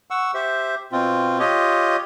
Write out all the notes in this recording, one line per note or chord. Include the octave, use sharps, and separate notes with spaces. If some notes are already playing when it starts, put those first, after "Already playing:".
F#5 C#6 E6
G4 C5 E5
B2 C4 F4
F4 G4 C#5 D#5